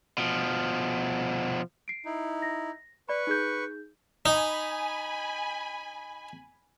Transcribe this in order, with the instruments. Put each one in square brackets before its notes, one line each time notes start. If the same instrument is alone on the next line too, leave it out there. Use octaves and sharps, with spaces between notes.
[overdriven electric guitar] B2 F3
[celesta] C7 D7
[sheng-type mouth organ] D#4 E4
[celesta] A#6
[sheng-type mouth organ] B4 C#6 [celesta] D5 B5
[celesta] D#4 G#4 G6
[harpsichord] D#4 [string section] G#5 B5